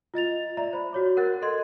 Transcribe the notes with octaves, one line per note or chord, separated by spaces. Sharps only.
F4 D#5 A6 F7
D5 E5 A#5
C5 B5
F#4 C#5 D6
A#4 F#5 F#6 A6
A4 A#4 D#5 C6 G#6